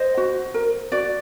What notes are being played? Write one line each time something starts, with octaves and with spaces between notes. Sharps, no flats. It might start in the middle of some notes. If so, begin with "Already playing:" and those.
Already playing: C5 D#5
F#4
A#4
F#4 D5